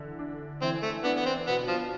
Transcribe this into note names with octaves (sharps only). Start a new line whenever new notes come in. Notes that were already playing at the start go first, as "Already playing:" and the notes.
Already playing: D3 E3
D4
E3 C4
A3
B3 D4
B3
C4
B2 B3
F3